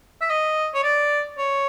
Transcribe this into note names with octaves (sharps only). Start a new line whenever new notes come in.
E5
D#5
C#5
D5
C#5